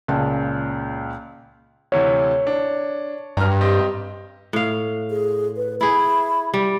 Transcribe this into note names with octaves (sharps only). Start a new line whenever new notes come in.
C#2 A#2 C#3 A5
D2 C3 E3 C#5
D4
G2 A#5 F6
C4 G4 D#5
A2 F5
G#4
B4
E4 G#4 B5
G3